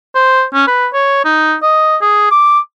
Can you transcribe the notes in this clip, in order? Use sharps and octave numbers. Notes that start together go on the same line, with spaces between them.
C5
C#4
B4
C#5
D#4
D#5
G#4
D6